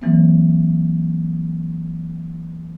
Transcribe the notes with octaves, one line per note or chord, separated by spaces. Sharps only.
E3 F#3 A#3 C4